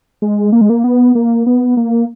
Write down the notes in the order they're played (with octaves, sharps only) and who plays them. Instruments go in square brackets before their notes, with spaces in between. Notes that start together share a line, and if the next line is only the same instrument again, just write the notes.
[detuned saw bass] G#3
A#3
G#3
A#3
B3
A#3
B3
A#3